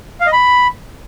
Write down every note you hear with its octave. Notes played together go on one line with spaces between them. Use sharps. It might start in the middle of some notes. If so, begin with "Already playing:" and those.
F5
D#5
B5